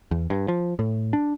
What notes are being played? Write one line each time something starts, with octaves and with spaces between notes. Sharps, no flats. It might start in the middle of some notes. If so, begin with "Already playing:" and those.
E2
G2
F3
A2
D4